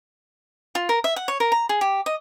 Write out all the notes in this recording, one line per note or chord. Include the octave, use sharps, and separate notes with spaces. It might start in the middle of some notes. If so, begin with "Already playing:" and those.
F4
A#4
E5
F#5
C#5
A#4
A#5
G#4
G4
D#5